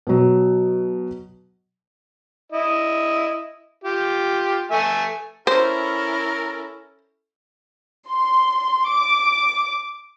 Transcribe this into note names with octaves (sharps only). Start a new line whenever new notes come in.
B2 F#3
E4 D#5
F4 G4
A3 E5 G#5
C#4 E4 A4 A#4 C5
C6
D6